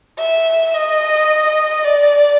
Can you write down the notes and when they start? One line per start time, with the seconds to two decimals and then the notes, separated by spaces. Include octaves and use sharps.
0.18 E5
0.74 D#5
1.84 D5